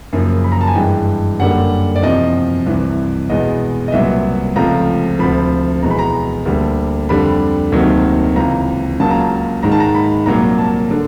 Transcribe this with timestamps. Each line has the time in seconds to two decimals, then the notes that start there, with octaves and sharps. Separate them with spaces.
0.13 F#2 C#3 F3 A#3
0.44 B5
0.52 A#5
0.61 A5
0.68 G#5
0.75 G2 E3 G#3 G5
1.39 F#2 D3 G3 A#3 F#5
1.96 D5
2.02 E2 C3 F3 D#5
2.66 C2 C3 E3
3.29 E2 B2 G#3 B3 D#5
3.88 D#5
3.92 C2 A#2 F#3 B3 E5
4.56 C#2 C3 F3 A3 A#5
5.19 D2 C3 F3 B5
5.82 E2 B2 G#3 B3 A#5
5.90 B5
5.99 A#5
6.45 D2 D3 G3 A#3
7.09 F2 D3 G3 B5
7.72 D2 C3 D#3 F#3 A#3
8.36 C#2 C3 E3 A#5
9.00 C#2 C#3 F#3 A#3 A5
9.11 A#5
9.21 A5
9.63 G#2 D#3 G#3 A#5
9.72 A5
9.80 A#5
9.95 B5
10.26 C2 A#2 F#3 A#3 A#5
10.58 A5
10.91 D3